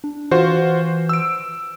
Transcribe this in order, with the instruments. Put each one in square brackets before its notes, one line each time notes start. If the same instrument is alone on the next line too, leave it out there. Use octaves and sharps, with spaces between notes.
[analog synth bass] D4
[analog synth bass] E3 [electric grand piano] F4 F#4 C5
[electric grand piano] E6 D7